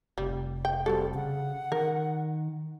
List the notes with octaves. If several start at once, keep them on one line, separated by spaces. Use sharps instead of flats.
F1 G3
G5
G3 C4 F#4 A4
C#3 F#5
D#3 A#4